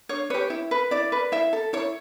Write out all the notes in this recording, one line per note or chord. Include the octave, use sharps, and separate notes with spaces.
D4 C#5
G4 B4 C#5
E4
B4
E4 D5
B4
E4 E5
A4
E4 C#5